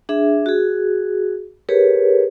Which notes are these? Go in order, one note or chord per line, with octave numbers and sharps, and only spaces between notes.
D4 G#4 E5
F#4 G#4
G4 G#4 A#4 B4 C#5